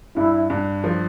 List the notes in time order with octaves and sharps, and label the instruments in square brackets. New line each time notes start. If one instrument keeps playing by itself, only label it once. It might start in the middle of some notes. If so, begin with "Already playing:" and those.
[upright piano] G2 [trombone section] E4
[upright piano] G2
F3